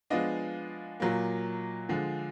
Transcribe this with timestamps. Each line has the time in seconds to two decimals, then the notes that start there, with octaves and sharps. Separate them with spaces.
0.10 F3 G#3 B3 D4 D#5 F5
1.00 A#2 F#3 A#3
1.89 D3 F3 G#3